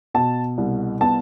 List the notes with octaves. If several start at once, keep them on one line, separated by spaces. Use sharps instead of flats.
B2 A5
C2
B3 A5